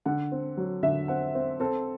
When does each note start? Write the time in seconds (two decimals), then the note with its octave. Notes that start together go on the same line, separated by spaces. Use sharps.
0.06 D3 F#5
0.32 C4
0.57 F#3
0.83 D3 E5
1.08 C4 F#5
1.35 C4
1.60 C4 A4